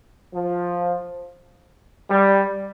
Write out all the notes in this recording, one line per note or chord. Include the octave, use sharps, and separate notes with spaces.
F3
G3